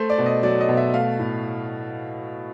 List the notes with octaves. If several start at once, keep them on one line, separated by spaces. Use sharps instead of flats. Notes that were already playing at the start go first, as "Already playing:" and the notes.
Already playing: A3 C5
D5
B2
D#5
F#3 D5
D#5
B2
E5
A3 F5
A2